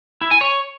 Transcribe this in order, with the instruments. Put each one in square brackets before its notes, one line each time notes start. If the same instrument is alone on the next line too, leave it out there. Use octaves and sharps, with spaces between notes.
[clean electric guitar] E4
G#5
C#5